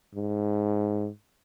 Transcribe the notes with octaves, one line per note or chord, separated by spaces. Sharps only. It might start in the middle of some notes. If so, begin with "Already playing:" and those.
G#2